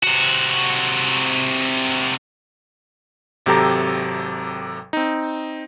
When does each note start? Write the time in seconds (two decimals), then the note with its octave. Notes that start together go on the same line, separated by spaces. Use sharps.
0.03 C3 F#4
3.46 G#1 C3 F#3 G4 A4 A#5
4.93 C4 D#4